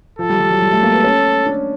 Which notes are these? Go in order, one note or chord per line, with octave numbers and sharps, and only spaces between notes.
F3 A4
G3
G3
F#3
G3
A3
A#3
B3
C#4
D4